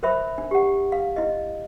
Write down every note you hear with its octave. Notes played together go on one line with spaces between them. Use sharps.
A#4 C5 E5 B5
D4
G4 F#5
F5
E4 D#5